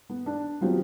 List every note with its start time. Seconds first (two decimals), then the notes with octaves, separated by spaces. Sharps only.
0.10 B3
0.26 D4
0.61 F#3 B3 C4 F4 G4